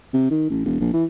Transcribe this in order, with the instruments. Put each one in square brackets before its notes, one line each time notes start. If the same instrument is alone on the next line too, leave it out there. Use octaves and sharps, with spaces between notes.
[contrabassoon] C3
D#3
A1
E1
A#1
E3